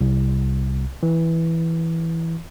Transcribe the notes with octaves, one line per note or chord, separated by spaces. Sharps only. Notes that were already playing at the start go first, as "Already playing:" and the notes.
C2
E3